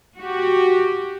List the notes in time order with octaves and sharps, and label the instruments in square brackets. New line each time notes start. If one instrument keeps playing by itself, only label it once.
[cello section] F#4 G4